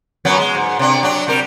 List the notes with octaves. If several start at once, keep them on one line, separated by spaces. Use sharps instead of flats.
F#2 F#3 B3
G#3
G#2
C3 D4
F#3 D4
C3 G3 A#4